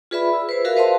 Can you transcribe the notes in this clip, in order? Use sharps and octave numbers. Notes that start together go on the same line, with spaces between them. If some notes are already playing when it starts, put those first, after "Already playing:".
F4 G#4 B4 D5 E5 B5
E6
B4 C5
F#4 G#4 A#4 E5 F5
B4 C5 D#5 F5 A5 C6